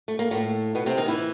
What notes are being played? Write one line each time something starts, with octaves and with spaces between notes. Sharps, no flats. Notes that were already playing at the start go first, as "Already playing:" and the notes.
A3
A#3
A2 A3
B2 B3
C3 C4
D#3 D#4
E3 E4